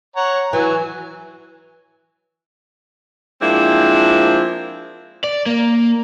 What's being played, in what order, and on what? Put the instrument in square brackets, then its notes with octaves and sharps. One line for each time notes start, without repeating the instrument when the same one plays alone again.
[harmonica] C#5 F#5 A#5
[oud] E3 [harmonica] F#3 G#5
[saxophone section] F3 G#3 A#3 C4 D4 E4
[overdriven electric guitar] D5
A#3